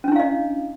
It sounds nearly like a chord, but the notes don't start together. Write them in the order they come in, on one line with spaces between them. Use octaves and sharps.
C#4 D4 E4 F5 D#5